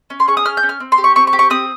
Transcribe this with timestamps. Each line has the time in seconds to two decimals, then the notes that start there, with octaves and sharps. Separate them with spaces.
0.10 C#4
0.20 C6
0.28 G#4 C#6
0.37 D#6
0.45 C#4 F6
0.57 G6
0.63 C#4
0.69 F6
0.80 C4
0.92 C6
0.98 G4
1.04 C#6
1.16 C4 C#6
1.27 C#6
1.33 G4
1.39 C#6
1.50 C4 D#6